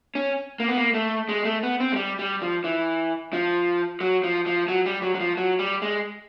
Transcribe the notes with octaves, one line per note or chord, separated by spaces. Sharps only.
C#4
A#3
B3
A#3
A3
G#3
A3
B3
C4
G#3
G3
G3
F3
E3
F3
F#3
F3
F3
F#3
G3
F#3
F#3
F3
F#3
G3
G#3